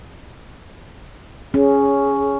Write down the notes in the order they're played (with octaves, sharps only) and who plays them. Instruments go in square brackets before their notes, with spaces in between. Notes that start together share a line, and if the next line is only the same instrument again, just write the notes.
[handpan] C#4 [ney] G#4